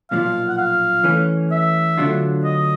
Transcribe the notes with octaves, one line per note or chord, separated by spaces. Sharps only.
B1 A#2 F3 F5
F#5
F5
E3 A3 C#4
E5
D3 F#3 A3 D4 F4
D#5